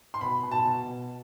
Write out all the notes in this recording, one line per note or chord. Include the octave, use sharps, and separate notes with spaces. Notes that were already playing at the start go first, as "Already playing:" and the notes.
C6
B2 B5
B2
A5
B2
B2